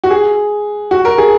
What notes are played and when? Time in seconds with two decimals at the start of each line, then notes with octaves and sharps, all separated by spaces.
0.04 F#4
0.10 G#4
0.91 F#4
1.05 A#4
1.18 G#4